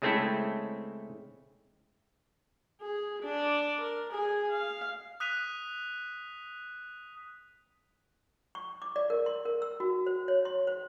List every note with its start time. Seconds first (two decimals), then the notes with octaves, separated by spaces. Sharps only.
0.02 C#3 G#3 A3 C4 E4 A4
2.82 G#4
3.23 D4 D5
3.82 A#4
4.12 G#4 G#5
4.50 F5
5.20 D#6 F#6 B6 D#7 F7
8.55 C#6
8.82 D6
8.96 D5
9.10 A#4
9.26 C6
9.45 A#4
9.62 E6
9.80 F#4
10.07 C5
10.28 C#5
10.45 C6
10.67 C5